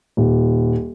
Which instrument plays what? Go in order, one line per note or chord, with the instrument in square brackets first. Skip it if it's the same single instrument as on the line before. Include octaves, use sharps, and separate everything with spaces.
[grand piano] D#1